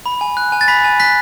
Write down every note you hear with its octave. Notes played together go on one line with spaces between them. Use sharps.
B5
G#5
F#6
G#5
A6
B5 B6
G#5
F#6 B6